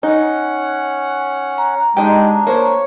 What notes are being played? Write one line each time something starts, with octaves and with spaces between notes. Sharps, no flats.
C#4 D#4 F#5
A#5
G#3 D4 D#4 G4
A#3 C5 C#5